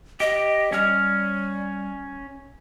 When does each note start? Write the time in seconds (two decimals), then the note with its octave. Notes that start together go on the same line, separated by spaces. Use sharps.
0.20 G4 D#5
0.72 G3 C#4 F6